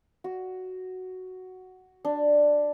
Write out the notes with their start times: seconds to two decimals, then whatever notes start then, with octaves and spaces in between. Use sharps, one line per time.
0.24 F#4
2.05 D4